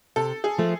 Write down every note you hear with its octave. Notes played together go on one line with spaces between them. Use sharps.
C3 A4
G#4
F3 A3